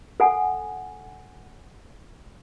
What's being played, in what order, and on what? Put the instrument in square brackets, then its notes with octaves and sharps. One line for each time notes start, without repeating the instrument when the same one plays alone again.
[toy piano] A4 F#5 G#5